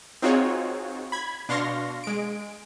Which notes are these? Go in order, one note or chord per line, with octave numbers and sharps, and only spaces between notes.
C4 D#4 F4 F#4 G#4 C#5
B5 G#6
B2 D4 F5 C6 C#6 A#6
G#3 D7